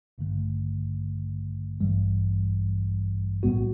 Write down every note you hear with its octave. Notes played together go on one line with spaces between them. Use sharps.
A1 G2 D3 A3
A1 G2 E3 G3
B1 A2 G3 B3 F#4